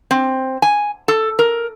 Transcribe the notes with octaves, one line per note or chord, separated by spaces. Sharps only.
C4
G#5
A4
A#4